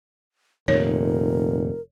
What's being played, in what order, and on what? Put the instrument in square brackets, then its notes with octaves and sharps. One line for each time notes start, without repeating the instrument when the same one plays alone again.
[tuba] F1 [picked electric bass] F2 A#2 D#3 [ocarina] A#4 [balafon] C#5